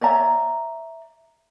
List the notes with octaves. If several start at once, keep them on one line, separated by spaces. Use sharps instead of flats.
C#5 D5 E5 A#5